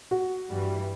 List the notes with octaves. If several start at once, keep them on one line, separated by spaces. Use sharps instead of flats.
F#4
G2 E3 G3